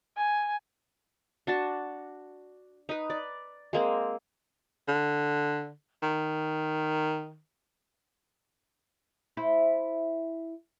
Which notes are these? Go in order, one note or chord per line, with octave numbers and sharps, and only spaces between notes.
G#5
D4 F#4 A5
D#4 B4
D5
G#3 A#3 C4
D3
D#3
E4 C5